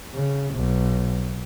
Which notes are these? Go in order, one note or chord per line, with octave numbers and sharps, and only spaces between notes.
C#3
B1